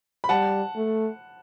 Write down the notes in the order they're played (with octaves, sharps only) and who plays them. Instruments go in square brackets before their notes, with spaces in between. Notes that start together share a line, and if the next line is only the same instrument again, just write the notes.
[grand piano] B5
[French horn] G3 [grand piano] F#5 A5
[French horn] A3